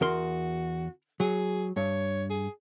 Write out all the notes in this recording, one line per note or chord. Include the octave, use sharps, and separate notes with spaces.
E2 F#4 A#4 C6
F#3 G#4
G2 C#5
G#4